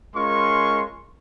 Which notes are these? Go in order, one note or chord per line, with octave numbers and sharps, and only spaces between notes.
G#3 C#4 F4 A#4 C6 C#6